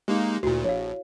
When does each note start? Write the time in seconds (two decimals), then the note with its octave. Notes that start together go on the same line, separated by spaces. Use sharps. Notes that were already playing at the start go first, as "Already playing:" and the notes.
0.08 G#3 A#3 D#4 G4
0.43 D2 A#2 E4 F#4
0.64 A#1 C#5 F5